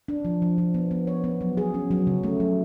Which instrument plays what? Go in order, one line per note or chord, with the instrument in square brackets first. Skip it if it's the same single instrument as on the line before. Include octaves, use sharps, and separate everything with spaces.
[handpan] D4
F3
F3
F3
B3
B3
C#5
B3
F#3
G#4
C#4
F#3
C#3
A3
F#3